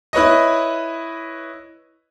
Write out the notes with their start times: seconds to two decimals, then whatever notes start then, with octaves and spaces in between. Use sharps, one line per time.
0.13 E4 B4 C#5 D#5